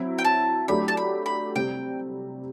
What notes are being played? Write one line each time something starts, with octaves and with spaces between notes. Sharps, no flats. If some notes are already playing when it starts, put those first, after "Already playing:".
Already playing: F#3 C4 E4
G5
A5
F#3 A3 D4 G4 B5
A5
B5
B5
C3 G3 C4 G5